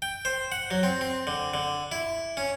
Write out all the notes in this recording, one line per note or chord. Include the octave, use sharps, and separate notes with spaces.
G5
C5
F#5
F#3
C4
C4
D3
D3
E4
C#4